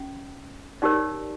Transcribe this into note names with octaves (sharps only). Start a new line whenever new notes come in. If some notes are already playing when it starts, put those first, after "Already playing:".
Already playing: C#4
D#4 G4 A#4 C#5 D5